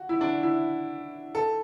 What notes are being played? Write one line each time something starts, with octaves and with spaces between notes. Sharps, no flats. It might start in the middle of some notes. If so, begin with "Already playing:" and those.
Already playing: F#4
E4
D4
E4
A4